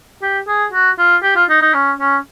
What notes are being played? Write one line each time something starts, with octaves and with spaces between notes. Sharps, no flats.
G4
G#4
F#4
F4
G4
F4
D#4
D#4
C#4
C#4